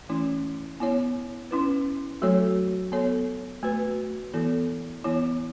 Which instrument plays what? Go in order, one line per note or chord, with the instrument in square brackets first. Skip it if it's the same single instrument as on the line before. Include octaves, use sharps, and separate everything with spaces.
[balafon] E3 A3 C#4 E4
B3 E4 C#5
C#4 E4 B4
F#3 A3 F#4 A4 C#5
B3 A4 C#5
A3 F#4 B4
E3 B3 E4 A4
E3 B3 E4 C#5